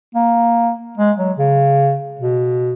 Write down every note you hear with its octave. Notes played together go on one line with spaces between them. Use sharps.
A#3
G#3
F#3
C#3
B2